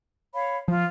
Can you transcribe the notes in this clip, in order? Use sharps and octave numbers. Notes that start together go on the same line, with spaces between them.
C#5 F5 B5
F3 F4